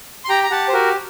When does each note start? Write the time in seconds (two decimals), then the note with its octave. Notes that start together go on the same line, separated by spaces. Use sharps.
0.24 C6
0.29 G4 G5 A#5
0.43 A#5
0.51 G4 F#5 A5
0.68 C5
0.73 F#4 A#4